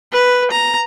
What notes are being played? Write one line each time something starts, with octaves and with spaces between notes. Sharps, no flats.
B4
A#5